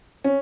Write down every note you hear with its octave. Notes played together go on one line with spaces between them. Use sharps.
C#4